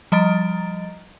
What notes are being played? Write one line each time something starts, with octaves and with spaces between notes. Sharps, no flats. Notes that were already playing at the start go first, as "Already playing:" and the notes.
F3 G3 D#5 A#5 A6 D7